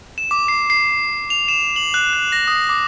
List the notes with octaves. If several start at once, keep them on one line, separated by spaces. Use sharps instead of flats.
E7
D6
C7
C7
F7
E7
F#7
F#6
F#6
A#6
D#6
D6